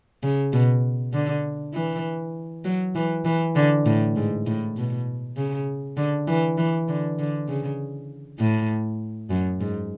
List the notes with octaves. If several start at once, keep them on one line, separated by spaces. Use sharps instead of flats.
C#3
B2
D3
E3
F#3
E3
E3
D3
A2
G#2
A2
B2
C#3
D3
E3
E3
D3
D3
C#3
A2
F#2
G#2